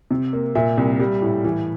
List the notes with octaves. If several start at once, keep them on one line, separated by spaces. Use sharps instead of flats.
C3
A#3
A#2 E5
C2
G3
A2
E3